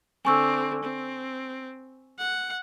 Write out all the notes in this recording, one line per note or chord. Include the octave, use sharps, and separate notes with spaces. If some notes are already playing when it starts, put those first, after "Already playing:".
D3 C4 G#5 C#6 E6
C4
F#5